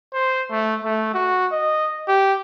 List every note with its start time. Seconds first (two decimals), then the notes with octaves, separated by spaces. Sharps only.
0.13 C5
0.51 A3
0.84 A3
1.14 F#4
1.52 D#5
2.08 G4